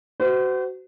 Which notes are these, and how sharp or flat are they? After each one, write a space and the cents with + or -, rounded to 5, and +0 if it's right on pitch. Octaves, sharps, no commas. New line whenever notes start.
F#4 +25 C5 -40